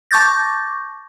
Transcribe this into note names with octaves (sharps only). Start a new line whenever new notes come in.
A5 C#6 D6 G6 A6 A#6